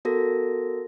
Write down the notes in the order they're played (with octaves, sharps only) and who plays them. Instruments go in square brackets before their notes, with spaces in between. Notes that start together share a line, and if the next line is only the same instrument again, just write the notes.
[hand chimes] B3 F#4 A4 A#4 A#6